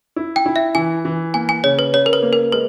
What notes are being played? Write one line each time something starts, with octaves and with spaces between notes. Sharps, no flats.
E4
G5
E4
E5
E3 G#5
E3
A#3 G#5
G#5
C#3 C#5
B4
C#3 C#5
A#4
B4
A#3
A#4
G#3 B4